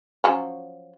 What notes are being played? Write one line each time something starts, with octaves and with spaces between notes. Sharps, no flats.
F3 F#3 C#4